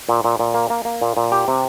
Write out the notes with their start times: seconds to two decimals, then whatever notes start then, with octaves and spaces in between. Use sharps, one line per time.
0.09 A#2
0.25 A#2
0.40 A#2
0.54 A#3
0.70 A#3
0.85 A#3
1.02 A#2
1.17 A#2
1.32 G4
1.48 C3